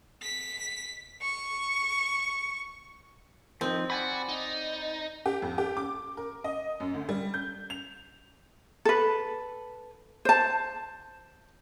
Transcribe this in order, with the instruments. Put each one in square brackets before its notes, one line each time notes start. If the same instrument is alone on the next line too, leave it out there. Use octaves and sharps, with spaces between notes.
[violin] B6
C#6
[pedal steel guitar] F3 D#4 [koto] C4
[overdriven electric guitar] F#4 [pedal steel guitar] D5 G#5 B5
[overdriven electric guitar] D#4
[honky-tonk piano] G4
F2
G4
D6
A#4
D#5
F#2
D2
G3
G6
F7
[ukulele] A4 B4
C5 A5